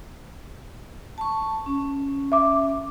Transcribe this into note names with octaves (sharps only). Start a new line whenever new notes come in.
A5 C#6
C#4
E5 D6